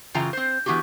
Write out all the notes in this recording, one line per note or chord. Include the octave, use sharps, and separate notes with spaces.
F#2 C#3 E3 F4 G5 A#5
C4 C5
E3 B3 E4 F#4 G4